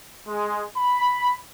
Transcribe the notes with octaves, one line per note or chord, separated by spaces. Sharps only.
G#3
B5